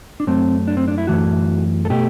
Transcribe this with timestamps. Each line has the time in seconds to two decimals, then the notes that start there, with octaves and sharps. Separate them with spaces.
0.20 D4
0.27 F#2 F#3 A3 C4
0.68 D4
0.77 C4
0.88 D4
0.98 E4
1.07 F#2 E3 A3 F#4
1.85 A4
1.90 B2 A3 G4